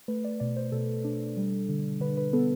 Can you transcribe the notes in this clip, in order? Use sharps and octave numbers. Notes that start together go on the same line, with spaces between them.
A3 B4
D5
B2 D5
C5
B2 A4
D4
G3
D3
D3 B4
B4
B3 A4